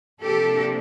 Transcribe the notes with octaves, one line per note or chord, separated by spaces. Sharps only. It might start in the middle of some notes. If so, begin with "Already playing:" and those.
C3 F3 A#3 D4 G4 A4